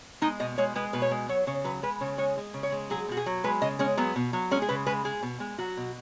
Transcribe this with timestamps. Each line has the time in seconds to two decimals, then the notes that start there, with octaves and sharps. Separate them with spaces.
0.21 G#3 D#4
0.40 B2 D#5
0.58 G#3 C#5
0.76 G#3 B4
0.93 B2 B4
1.02 C#5
1.11 G#3
1.29 F#3 C#5
1.47 C#3 C#5
1.64 F#3 B4
1.83 G#3 B4
2.01 C#3 C#5
2.18 G#3 C#5
2.37 G#3
2.54 C#3
2.63 C#5
2.72 G#3
2.90 F#3 G#4
3.08 B2 F#4
3.17 G#4
3.26 F#3
3.44 G#3 B4
3.62 C#3 D#5
3.79 G#3 C#4
3.97 F#3 B3
4.16 B2
4.33 F#3
4.51 G#3 C#4
4.62 G#4
4.69 C#3 B4
4.86 G#3 B4
5.04 G#3 G#4
5.23 B2
5.40 G#3
5.58 F#3 F#4
5.77 B2